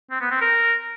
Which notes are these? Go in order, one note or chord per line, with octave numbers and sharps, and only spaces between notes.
C4
B3
C4
A#4